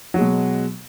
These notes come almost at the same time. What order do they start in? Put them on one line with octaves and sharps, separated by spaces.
F#3 G#3 B2